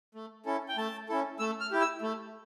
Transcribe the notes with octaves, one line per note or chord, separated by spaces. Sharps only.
A3
C#4 E4 A4
G5
A3 A5
C#4 E4 A4
A3 E6
F6
E4 G4
E6
A3